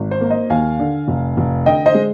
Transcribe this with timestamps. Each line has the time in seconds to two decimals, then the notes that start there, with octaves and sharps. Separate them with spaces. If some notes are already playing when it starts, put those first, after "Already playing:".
Already playing: G#1
0.11 C5
0.21 A#3
0.30 C5 D#5
0.50 D#2 F5 G#5
0.79 D3
1.08 F1
1.37 F1
1.66 D3 D#5 G5
1.86 C5 D#5
1.95 G#3